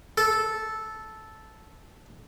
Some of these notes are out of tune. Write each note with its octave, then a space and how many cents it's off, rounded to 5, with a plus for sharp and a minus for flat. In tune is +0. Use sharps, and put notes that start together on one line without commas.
A4 -10